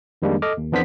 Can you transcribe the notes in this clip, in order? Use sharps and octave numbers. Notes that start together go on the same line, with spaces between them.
F2 D#3 G3 G#3 A#3 D4
A4 D#5 D6 F6
D#2
F2 E3 B3 D4 C5 B6